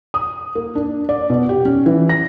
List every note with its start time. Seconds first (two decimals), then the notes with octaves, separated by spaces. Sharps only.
0.14 D#6
0.55 A#3
0.75 D4
1.09 D5
1.30 B2
1.49 G4
1.65 C#4
1.86 E3
2.09 A#6